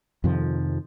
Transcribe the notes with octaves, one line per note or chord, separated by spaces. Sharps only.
F2 C3 D#3 F3